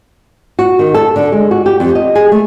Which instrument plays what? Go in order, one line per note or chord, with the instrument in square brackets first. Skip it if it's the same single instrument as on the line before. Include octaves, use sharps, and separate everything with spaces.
[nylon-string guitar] F#4
D#3
A4
D3
G#3
F#4
G4
F2
D#5
G#4
A3